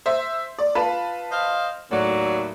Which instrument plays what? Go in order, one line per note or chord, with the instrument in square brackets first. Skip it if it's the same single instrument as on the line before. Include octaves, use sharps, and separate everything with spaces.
[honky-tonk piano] C5 E5
D5
F4 B4 A5
[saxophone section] C5 D#5 F5
[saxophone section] D#2 F#3 D5 [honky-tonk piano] A2